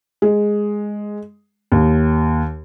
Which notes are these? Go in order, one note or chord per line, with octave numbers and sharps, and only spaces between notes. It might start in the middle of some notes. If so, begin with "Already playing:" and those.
G#3
D#2